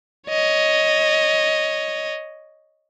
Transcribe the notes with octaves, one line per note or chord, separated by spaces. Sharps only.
C#5 D#5